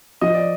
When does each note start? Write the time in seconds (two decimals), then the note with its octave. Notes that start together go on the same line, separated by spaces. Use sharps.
0.21 F3 D#5
0.34 D5